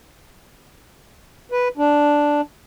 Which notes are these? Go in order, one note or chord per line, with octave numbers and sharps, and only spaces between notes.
B4
D4